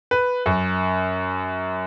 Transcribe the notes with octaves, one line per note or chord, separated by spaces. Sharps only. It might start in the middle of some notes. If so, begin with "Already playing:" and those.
B4
F#2